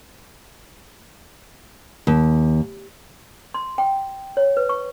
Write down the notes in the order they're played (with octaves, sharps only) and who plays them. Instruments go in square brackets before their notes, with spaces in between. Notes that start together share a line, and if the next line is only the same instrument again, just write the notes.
[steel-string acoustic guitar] D#2
[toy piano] C6
G5
C#5
B4
C#6